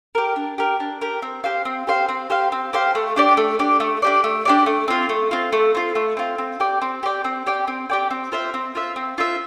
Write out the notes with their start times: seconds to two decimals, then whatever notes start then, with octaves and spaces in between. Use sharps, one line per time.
0.15 G4 A#4
0.36 D4
0.58 G4 A#4
0.80 D4
1.01 G4 A#4
1.22 C4
1.44 G4 C5 F5
1.65 C4
1.87 G4 C5 F5
2.09 C4
2.30 G4 C5 F5
2.52 C4
2.73 G4 C5 F5
2.95 A3
3.16 D4 G4 D5
3.37 A3
3.59 D4 G4 D5
3.80 A3
4.02 D4 G4 D5
4.24 A3
4.45 D4 G4 D5
4.66 A3
4.88 C4 F4
5.09 A3
5.31 C4 F4
5.53 A3
5.75 C4 F4
5.95 A3
6.17 C4 F4
6.38 C4
6.60 G4 D5 G5
6.82 C4
7.03 G4 D5 G5
7.24 C4
7.47 G4 D5 G5
7.68 C4
7.90 G4 D5 G5
8.11 C4
8.32 F4 C5 E5
8.54 C4
8.75 F4 C5 E5
8.96 C4
9.18 F4 C5 E5